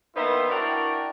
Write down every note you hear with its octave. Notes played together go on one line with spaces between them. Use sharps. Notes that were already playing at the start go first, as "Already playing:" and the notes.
D#3 A#3 B3 D#4 E4 C5
D4 E4 F#4 A#4 D5 G5